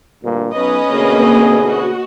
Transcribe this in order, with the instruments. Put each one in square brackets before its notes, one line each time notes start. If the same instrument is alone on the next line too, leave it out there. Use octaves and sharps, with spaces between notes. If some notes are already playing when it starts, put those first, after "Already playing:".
[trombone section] D2 G2 A#2
[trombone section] B1 [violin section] C#4 B4 D#5
[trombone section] D2 B2 G#4 [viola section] A#3 C4
[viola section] F#4